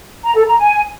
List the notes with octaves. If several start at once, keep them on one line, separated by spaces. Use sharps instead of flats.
A#5
A4
A#5
G#5